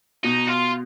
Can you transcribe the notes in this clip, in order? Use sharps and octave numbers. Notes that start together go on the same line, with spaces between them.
B2 D#4
F4